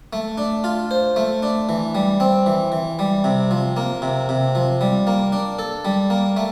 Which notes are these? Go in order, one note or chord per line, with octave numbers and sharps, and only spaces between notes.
A3
D4
F4
C5
A3
D4
E3
G3
C4
E3
E3
G3
C3
F3
A#3
C3
C3
F3
G3
A#3
D4
A4
G3
A#3
A3